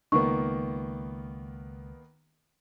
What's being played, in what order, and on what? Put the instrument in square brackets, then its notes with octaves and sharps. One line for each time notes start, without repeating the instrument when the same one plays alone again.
[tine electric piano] C#2 [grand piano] D#3 A#3 B3 [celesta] C#6